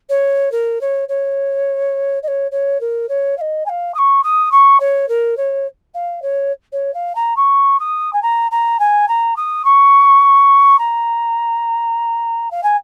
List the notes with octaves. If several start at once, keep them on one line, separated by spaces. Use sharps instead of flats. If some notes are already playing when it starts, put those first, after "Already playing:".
C#5
A#4
C#5
C#5
D#5
C#5
C#5
A#4
C#5
F5
D#5
G#5
F5
D#6
C#6
D#6
C#6
C#5
A#4
C#5
F5
C#5
C#5
F5
A#5
C#6
D#6
G#5
A#5
A#5
G#5
A#5
D#6
C#6
A#5
F5
G#5